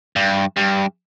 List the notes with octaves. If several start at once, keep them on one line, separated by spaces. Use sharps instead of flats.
G2
G2